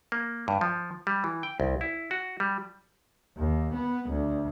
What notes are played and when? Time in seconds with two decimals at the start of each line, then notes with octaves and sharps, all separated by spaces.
0.12 A#3
0.48 G2
0.61 F3
1.07 G3
1.24 E3
1.43 G5
1.60 C2
1.81 E4
2.11 F#4
2.40 G3
3.38 D#2
3.74 B3
4.10 D2